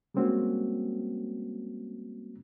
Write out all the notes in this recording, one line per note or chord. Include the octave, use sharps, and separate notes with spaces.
G3 G#3 A#3 C4 C#4 F#4